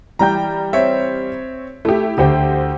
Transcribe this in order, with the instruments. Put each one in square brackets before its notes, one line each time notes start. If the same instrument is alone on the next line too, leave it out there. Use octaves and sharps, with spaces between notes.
[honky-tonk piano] E3 G3 G5 [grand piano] A#5 G6
[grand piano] C4 C#5 E5
[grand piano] A3 [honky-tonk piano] E4 G4
[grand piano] D2 D3 [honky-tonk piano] G4 C5 G5